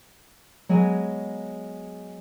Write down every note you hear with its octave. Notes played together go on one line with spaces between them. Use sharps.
F#3 G#3 B3 G#5